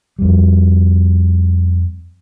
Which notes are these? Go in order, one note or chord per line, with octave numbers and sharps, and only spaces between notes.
F2 G3